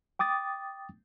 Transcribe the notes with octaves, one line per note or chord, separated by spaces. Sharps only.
G5 D6 D#6 A6